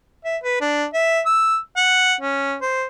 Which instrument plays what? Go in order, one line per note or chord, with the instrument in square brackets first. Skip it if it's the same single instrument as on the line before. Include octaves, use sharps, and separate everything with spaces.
[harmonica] E5
B4
D4
E5
E6
F#5
C#4
C5